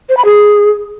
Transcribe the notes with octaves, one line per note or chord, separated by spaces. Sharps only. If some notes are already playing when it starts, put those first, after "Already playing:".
C5
B5
G#4